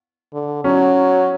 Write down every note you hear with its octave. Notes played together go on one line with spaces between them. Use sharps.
D3
F#3 C#4